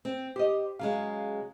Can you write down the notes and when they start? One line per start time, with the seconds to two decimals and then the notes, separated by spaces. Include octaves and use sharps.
0.05 C4
0.36 G4 C5 D#5
0.79 C#3 F#3 G#3 F5